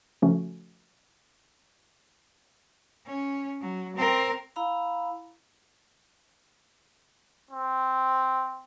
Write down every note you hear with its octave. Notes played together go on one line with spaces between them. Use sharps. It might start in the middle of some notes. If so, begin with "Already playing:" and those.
C#3 F3 A3 C#4 F#4
C#4
F#3
C4 A#4
E4 F5 A#5 B5
C4